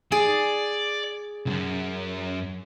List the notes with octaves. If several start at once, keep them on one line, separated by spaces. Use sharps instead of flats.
G#4 D5
C#2 F#2